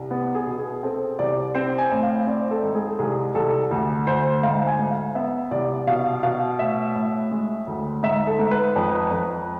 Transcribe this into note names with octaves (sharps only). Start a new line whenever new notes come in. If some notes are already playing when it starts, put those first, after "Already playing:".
Already playing: C2
B3
G#4
B2
G#4
C4 A4
C2 D5
C4 C5
G#5
A2
F5
C4 D5
A4
G#2
G#4
A4
C2 G#4
C2 A4
D2
D2 C5
G#2 F5
G#5
G#2
F5
B3 E5
C2 D5
B2 F5
B2 F5
A2 E5
A2
G#3
D2
G#2 E5
A4
G#2
B4
F2
F2